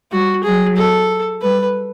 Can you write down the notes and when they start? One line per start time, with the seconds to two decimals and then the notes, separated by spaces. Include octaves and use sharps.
0.12 G3 F#4
0.44 F#3 G#4
0.77 A4
1.42 G3 B4